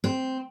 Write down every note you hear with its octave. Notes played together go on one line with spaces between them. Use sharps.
C4